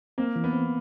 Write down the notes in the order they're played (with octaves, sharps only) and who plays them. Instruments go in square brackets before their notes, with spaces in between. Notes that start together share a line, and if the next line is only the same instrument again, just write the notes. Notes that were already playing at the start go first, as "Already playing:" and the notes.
[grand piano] A#3 [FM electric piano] C4
[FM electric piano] E3
[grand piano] B3
[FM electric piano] C4